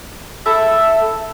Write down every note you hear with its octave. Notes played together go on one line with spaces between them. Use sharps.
E4 A4 E5